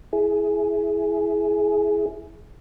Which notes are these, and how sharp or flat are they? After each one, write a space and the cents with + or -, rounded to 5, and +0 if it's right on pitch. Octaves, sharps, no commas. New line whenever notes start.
E4 +0 G#4 +15